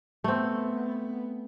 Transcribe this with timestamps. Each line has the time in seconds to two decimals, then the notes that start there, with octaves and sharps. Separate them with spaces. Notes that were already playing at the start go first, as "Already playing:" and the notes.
0.24 A3 B3 C4